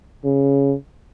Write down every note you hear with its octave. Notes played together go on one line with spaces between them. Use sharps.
C#3